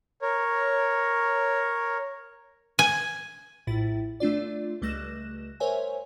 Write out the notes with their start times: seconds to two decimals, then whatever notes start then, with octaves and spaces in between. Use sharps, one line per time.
0.22 A#4 C#5
2.79 G#5
3.67 A#1 A2 E4 A6
4.20 A3 D4 F4 D5
4.82 C#2 G3 A3 F#6 A#6 E7
5.60 A#4 C5 C#5 E5 G#5